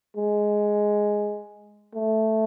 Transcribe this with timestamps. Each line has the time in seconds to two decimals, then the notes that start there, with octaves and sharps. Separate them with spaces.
0.17 G#3
1.95 A3